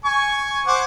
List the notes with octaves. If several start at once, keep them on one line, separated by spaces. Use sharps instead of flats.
G#5 C#6
C5 F#5 D6